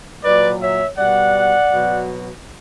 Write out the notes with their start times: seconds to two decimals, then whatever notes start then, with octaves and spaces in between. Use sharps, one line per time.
0.24 A#2 F#3 B4 D5
0.62 C#5 E5
0.98 B2 G3 D5 F#5
1.71 B2 F#3